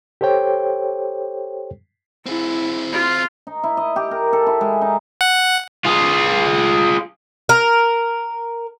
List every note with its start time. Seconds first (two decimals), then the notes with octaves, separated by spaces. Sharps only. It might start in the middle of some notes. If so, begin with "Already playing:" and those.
0.21 G4 A4 C5 C#5 G5
2.26 C4 E4 G#4
2.92 F4
3.47 D#4
3.64 E4
3.77 D#5
3.96 G4
4.11 A#4
4.33 A4
4.47 E4
4.61 G#3
4.81 D#4
5.21 F#5
5.85 F4 G#4
7.49 A#4